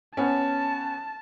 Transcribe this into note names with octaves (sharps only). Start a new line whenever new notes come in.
B3 C#4 A5